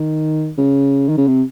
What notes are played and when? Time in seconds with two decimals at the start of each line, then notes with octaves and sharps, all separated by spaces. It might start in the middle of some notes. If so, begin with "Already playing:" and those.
Already playing: D#3
0.58 C#3
1.09 D#3
1.18 C#3
1.27 C3